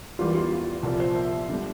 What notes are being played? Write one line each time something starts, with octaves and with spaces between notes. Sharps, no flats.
E2 E3 G3 A#3 F4
F4
F4
C2 A#2 F3 A#4
C5
E5
D3 G3